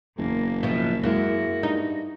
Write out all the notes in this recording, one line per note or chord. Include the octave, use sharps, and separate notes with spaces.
F#1 E2 A#3
B2 F3 E5
F#2 G#3 A#3 E4 F#4
G2 D#4